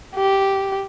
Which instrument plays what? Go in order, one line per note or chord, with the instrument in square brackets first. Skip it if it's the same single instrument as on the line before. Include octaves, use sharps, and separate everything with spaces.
[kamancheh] G4